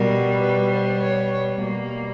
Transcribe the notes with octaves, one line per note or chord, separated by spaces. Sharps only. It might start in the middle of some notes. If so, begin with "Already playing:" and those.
Already playing: B2 G3 B3 A#4
B4
C5
C#5
B2 G3 A#3